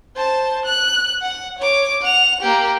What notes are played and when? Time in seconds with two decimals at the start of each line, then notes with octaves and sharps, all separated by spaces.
0.16 C5 A5
0.66 F#6
1.22 F#5
1.59 C#5 D6
2.02 F#5 F7
2.41 A#3 G4